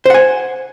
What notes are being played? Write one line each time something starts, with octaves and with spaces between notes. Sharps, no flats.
C5 F#5 G#5